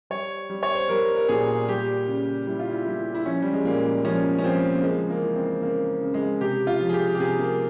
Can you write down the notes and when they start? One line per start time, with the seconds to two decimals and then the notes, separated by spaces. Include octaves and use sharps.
0.10 G3 C#5
0.50 G3
0.63 C#5
0.75 C5
0.89 G3 A#4
1.17 A#4
1.29 A#2 G#4
1.68 G3 G4
2.07 C#3
2.47 G3 E4
2.59 F4
2.71 E4
2.86 G3 E4
3.15 E4
3.26 F3 C#4
3.42 G3
3.53 G#3
3.65 A#2 A#3
4.05 F3 C#4
4.39 C#4
4.44 F3 C4
4.77 A#3
4.83 C#3 G#3
5.10 A#3
5.22 E3
5.36 C4
5.62 C#3 A#3
6.01 C#3
6.14 G#3
6.41 C3 G4
6.67 F4
6.80 F3
6.89 G#4
6.94 G4
7.15 G4
7.19 C3 G#4
7.39 A#3